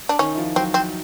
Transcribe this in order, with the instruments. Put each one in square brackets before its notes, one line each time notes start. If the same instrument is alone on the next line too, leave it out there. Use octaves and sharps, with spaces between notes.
[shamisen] D4
[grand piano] D#3 D#4 [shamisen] C#4
[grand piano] E4
F3 F4
[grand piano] F#3 F#4 [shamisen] C4
[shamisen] C4